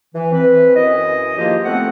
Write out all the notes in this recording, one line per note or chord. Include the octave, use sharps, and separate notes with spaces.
E3
C4 B4
F#2 E3 E4 D#5
G#2 D#3 F3 A#3 F4 G4
F3 A3 B3 C4 F#5